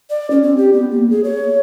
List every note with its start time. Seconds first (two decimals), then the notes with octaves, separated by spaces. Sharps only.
0.10 D5
0.31 C#4
0.43 C4
0.57 G4
0.73 B3
0.91 A#3
1.10 G#4
1.24 C#5